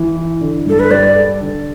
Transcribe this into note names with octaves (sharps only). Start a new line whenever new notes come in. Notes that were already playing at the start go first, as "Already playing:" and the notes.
Already playing: E3
E4
D3
G2 A4
B4
G3 D5
A4
D3